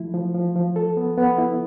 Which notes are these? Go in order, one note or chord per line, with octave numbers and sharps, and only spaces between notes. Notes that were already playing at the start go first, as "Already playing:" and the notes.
Already playing: F3 A3 E4
F3
F3
F3
A4
B3
B3
E4